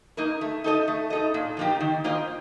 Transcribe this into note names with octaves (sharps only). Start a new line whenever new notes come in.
A#3 D#4 A#4
A3
D#4 A4 D#5
A3
D#4 A4 D#5
A#2
F3 A#3 D#4 G4
D#3
A#3 F4 C5 D#5